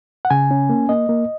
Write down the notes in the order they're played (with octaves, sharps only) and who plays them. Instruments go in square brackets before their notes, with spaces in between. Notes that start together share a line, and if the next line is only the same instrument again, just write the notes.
[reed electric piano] F#5
C#3 G#5
C#4
A#3
A#3 D#5
A#3